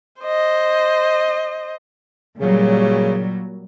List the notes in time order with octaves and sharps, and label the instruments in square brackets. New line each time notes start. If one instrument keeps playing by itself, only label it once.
[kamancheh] C5 D#5
[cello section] A#2 F#3 G3 [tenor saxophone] C#3